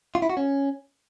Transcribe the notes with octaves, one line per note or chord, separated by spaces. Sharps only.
F4
E4
F#4
C#4